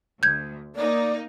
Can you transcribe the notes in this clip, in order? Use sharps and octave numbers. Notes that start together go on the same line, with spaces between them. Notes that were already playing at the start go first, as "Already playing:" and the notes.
D2 G6 G#6
A#3 D#4 D5